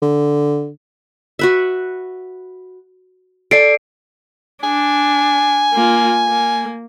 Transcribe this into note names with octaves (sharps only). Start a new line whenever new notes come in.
D3
F#4 B4 E5
A4 D5 C7 D7
D4 G#5
A#3 F4
A#3